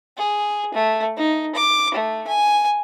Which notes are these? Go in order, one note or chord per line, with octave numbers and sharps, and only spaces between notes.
G#4
A3
D#4
D6
A3
G#5